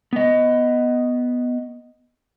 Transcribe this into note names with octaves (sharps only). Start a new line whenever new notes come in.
B3 D#5